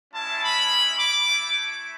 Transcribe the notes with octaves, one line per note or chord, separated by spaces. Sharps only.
G#3 C#4 E4 A5
B5
D6
A3 E4